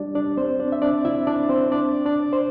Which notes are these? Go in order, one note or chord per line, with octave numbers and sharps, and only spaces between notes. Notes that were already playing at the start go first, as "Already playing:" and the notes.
Already playing: G3 D4 G4 D5
D4 D5
C4 C5
D4 D5
E5
D4 D5
E4 E5
D4 D5
C4 C5
D4 D5
D4 D5
C5